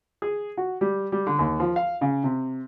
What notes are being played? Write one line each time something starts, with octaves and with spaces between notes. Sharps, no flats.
G#4
F#4
G3
G3
D3
D#2
F3
F5
C#3
C3